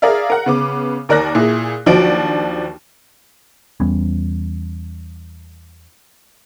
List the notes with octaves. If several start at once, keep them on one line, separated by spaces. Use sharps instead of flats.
G#4 A#4 D5 E5 F5
A#4 F#5
C#3 B3 D6
D#2 A#4 D5 F#6 A#6
A#2 E4 G#4
D#2 F3 F#3 D4 F#4 D7
E2 G3 B3 C#4